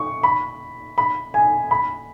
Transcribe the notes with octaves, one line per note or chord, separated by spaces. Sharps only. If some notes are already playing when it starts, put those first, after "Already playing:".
Already playing: C#6
B5
B5
G#5
B5